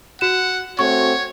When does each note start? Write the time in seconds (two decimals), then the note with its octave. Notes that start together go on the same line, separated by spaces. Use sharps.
0.21 F#4 F#5 E7
0.79 A3 C4 F#4 C#5 C#6